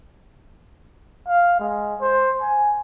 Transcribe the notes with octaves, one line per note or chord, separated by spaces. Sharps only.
F5
G#3
C5
G#5